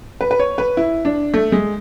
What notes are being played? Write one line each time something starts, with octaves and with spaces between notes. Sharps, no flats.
B4
B4
C#5
B4
E4
D4
A3
G#3